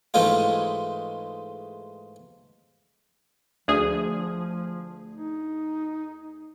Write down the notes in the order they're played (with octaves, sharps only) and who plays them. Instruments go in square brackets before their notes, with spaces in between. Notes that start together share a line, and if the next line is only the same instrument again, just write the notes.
[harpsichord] G#2 E3 G#3 A3 D#4 F4
[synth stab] D2 G#4 [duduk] F3
[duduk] D#4